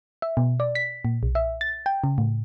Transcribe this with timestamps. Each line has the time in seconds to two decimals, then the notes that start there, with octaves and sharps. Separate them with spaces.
0.22 E5
0.37 B2
0.60 D5
0.75 B6
1.05 A#2
1.23 B1
1.35 E5
1.61 A6
1.86 G5
2.04 C#3
2.18 A2